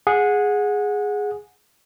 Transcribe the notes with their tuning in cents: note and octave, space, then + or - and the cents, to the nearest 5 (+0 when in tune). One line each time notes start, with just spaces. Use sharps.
G#4 +0 F#5 -20